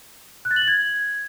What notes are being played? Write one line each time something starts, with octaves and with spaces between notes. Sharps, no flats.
F#6
A6
F#7
A6
G#6